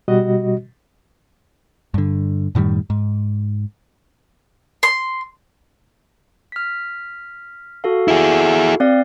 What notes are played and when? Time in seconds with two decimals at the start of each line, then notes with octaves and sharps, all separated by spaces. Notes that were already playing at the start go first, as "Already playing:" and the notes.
0.08 B2 G3 F#4 D#5
1.94 G2 D3
2.55 F#2 A2 D#3 G3
2.90 G#2
4.83 C6
6.52 F6 B6
7.84 F#4 A4 F5
8.08 E4 G#4
8.80 C4 D5 F5